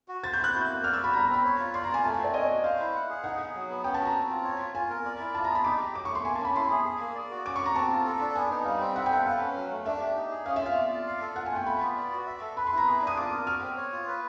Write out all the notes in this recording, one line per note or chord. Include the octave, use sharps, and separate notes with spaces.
F#4
C5 A6
G6
E4
F#6
F#4
A#3
D5 F6
E6
F#4 B5
G3 A#5
A#5
C4
B5
C#5
F4
D5 C6
A#5
F4 G#5
A3 A5
G#5
C4
D5
C#5 D#5
F#4
C5 F5
E4
F#5
G#4
D#4 F#5
G#4
F#3
B3
C#4 G5
A5
F#4
A#5
C4
F4
C#5
F4
F4 G#5
A#4
D5
E4
F4 A5
A#5
G#4
B5
D#4 D6
G4
F#3 D6
C#6
A3
C6
A#3 G#5
A5
C#4
B5
E4 C6
G#4
G#4
A#3
D5
F#4
C#4 D6
C#6
F#4 A#5
C4 A5
F4
A4
D4
B3 G#5
D#4
G3 F5
C4
E5 F#5
G5
A4 F#5
B4 F5
C#4
F#3
A3
D4 E5
G4
D#4
G#4
C#4 F5
E5
F4
F5
D5
F4
F5
A4
F4 F#5
G#5
A3 G5
F4 B5
B3
D5
F#4
E5
A4
B4 B5
C6
E4
A#5
G#4
D4
D#6
F4 D6
A#4
F#4 F6
C4
C#5
F4
B4